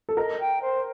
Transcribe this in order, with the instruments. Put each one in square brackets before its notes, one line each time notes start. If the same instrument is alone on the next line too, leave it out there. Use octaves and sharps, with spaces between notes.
[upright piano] A4
[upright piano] A#4 [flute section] D#5
[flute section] G5
C5